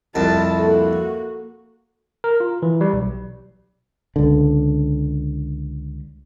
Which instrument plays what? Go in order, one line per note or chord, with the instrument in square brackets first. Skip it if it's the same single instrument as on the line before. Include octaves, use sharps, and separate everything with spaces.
[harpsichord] C2 F2 [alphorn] E4 [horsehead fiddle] A5
[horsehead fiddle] A#3 F#4 [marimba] A4
[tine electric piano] A#4
F4
E3
G3
B1
[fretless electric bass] C#2 D3